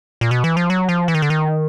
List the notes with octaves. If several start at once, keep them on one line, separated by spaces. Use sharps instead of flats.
A#2
B2
E3
F3
F#3
F3
E3
D#3
D3
D#3